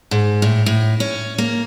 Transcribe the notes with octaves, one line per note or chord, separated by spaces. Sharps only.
G#2
A2
A2
C#4
A#3